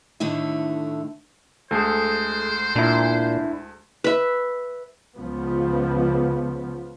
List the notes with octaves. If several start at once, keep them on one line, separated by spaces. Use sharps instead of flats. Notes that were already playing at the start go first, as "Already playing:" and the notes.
A2 D3 D#3 A3 E4
D2 G#3 A3 G#4 A4 C5
A#2 D4 E4
B4 E5
C#2 C#3 F3 B3